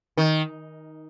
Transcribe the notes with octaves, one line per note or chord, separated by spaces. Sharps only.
D#3